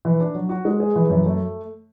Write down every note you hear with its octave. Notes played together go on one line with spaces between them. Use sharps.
E3
D4
F#3
F#4
G#3
G#4
E3
F#2
A3